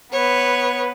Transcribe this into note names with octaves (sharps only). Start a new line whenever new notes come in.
B3 B4 C#5